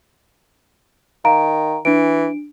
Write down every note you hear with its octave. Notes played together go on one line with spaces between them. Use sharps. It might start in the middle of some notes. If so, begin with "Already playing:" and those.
D#3 F5 A#5 D7
E3 D4 D7